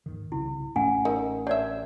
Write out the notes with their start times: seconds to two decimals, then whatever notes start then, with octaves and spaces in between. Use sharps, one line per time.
0.06 D#2 G#2 D#3
0.32 C2 C#3 C4 E4
0.76 A1 A2 A3 C#4 F#5 G#5
1.05 D#4 A#4
1.47 D4 C#5 D5 E5